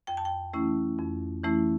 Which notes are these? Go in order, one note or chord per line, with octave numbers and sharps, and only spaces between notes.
F2 G5
A5
G5
E3 A3 C#4 E4
F2
E3 A3 C#4 E4